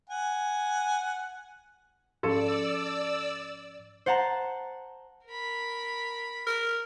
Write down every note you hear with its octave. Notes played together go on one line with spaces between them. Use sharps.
F#5 G#5
G#2 F3 C#4 A4 D5 E6
C5 F#5 A5 A#5
A#4 B5
A#4